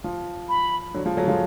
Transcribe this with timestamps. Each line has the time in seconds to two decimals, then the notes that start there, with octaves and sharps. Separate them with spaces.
0.04 F3
0.49 B5
0.94 D3 F#3
1.05 F3 G#3
1.17 F#3 A3
1.28 F3 G#3